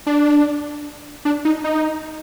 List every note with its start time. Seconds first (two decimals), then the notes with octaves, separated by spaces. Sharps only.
0.06 D4
1.25 D4
1.45 D#4
1.64 D#4